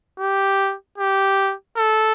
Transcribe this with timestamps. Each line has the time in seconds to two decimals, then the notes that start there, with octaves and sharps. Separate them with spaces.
0.20 G4
0.98 G4
1.77 A4